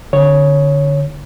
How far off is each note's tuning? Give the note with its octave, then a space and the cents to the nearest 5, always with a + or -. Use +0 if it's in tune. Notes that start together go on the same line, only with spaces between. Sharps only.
D3 +0 C#5 +0